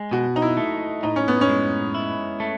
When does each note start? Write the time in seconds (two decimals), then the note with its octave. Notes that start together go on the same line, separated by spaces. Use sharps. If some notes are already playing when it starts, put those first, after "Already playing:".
Already playing: G#3
0.11 B2 F#4
0.36 D#4
0.42 E4
0.57 A3
1.03 A2 D#4
1.16 C#4
1.28 B3
1.41 C#4
1.49 G#3
1.95 E4
2.40 A3